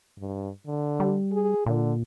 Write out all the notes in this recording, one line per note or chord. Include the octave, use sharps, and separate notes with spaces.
G2
D3
G3
G#4
A#2 D3